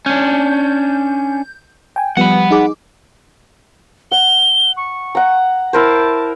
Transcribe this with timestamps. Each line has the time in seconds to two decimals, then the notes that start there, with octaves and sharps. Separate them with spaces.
0.06 C#4 D4 G6
1.96 G5 G#5
2.17 F3 G3 B3 F#5 B5
2.51 D#4 G#4 D6
4.12 F#5 G7
4.77 C#6
5.15 F#5 A#5
5.73 E4 A#4 C5 A5